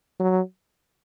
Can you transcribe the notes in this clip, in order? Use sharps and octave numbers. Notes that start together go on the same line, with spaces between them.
F#3